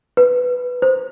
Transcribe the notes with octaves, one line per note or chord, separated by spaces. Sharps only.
B4
C5